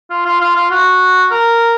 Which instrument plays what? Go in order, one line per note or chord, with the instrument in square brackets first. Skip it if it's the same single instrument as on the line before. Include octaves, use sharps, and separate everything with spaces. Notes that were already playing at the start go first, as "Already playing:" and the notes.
[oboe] F4
F4
F4
F4
F#4
A#4